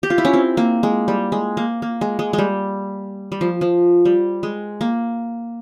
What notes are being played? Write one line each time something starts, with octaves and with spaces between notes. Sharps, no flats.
G4
F4
E4
C#4
C4
A#3
G#3
G3
G#3
A#3
A#3
G#3
G#3
G#3
G3
G3
F3
F3
G3
G#3
A#3